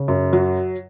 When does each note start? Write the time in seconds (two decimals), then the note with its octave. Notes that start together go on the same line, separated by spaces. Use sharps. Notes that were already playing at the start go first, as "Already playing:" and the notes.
Already playing: C#3
0.08 F#2
0.33 F#3